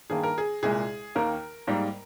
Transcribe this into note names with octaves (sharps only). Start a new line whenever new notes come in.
G2 D#3 A#3 G#4
A#4
G#4
C2 A#2 G#3 G#4
D#2 D#3 A#3 A#4
G#2 G3 A#3